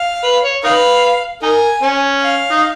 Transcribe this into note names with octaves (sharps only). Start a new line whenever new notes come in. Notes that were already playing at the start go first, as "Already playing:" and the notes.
Already playing: F5
B4
C#5
D#4 B4 F5
D#4 A#4 G#5
C#4
F5
D#4